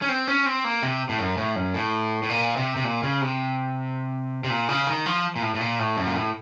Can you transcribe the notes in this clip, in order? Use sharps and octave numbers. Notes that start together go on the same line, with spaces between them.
C#4
C4
C#4
C4
A#3
C3
A2
F#2
A2
F#2
A2
A2
A#2
C3
C3
A#2
C#3
C3
C3
A#2
C#3
D#3
F3
A#2
A2
A2
A#2
A2
F#2
A#2
A2